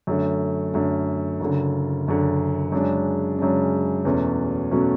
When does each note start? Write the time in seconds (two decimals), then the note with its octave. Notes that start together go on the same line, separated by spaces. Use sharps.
0.07 F#2 D3 A3
0.74 F#2 D3 A3
1.40 F#1 F#2 D3
2.07 F#1 F#2 D3
2.72 F#2 C#3 G#3 D4
3.38 F#2 C#3 G#3 D4
4.05 E2 B2 F#3 A3 C#4
4.71 B2 F#3 A3 C#4